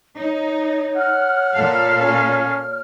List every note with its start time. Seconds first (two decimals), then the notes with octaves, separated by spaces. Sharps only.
0.18 D#4 C#5
0.96 F#5 F6
1.56 A#2 A4 F5
2.00 C#4